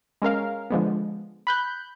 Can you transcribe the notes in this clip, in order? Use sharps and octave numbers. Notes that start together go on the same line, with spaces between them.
G#3 C#4 A#4 F5
D3 F3 G#3 B3
B5 F#6 G6